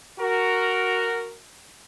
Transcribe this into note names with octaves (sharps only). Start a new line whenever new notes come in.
F#4 A#4